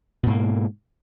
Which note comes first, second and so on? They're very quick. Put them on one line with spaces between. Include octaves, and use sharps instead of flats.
B2 G#2 A#3